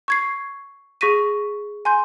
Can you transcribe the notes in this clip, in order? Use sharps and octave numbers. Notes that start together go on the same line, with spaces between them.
C#6 G#6 C7
G#4 C#6 A#6 B6 D#7
G#5 C6 G6